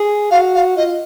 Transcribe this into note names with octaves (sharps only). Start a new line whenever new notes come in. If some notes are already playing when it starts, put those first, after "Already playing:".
Already playing: G#4
F#4 F5
F5
F4 D#5